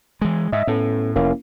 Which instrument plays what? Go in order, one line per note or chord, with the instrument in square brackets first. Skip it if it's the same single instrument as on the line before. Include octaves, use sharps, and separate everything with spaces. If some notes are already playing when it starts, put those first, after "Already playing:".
[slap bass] E3 G#3
[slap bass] G#2 [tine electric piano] D#5 E5
[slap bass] A2 [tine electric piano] B3 C#4 A4
[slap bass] F1 [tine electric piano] A#3 C#4 E4